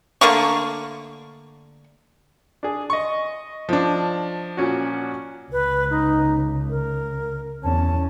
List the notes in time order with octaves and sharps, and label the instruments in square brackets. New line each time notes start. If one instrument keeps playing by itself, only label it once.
[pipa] D3 A3 A#3 C#6
[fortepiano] D4 G#4
D#5 C#6
[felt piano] F3 D4
[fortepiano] A#2 C#4 F#4
[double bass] C#2 [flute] B4
[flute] D#4
A#4
[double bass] E2 C#4 [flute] A5